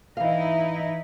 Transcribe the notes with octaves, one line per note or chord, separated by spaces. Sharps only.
E3 D#4 E4 F5